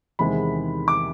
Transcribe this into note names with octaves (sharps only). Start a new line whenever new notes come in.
E2 C3 D#3 G#3 B5
D6